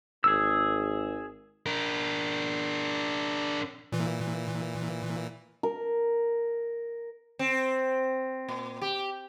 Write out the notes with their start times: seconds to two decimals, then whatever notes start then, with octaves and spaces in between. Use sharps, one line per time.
0.24 G#1 G#4 E6
1.66 D4 A#4
3.92 A#2 E3
5.63 A#4
7.39 C4
8.49 A#2
8.81 G4